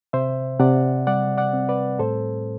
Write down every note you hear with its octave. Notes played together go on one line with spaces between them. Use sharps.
C3 C5 E5
C3 D5 F#5
G3 D5 F#5
D5 F#5
C4
B4 D5
A2 A4 C5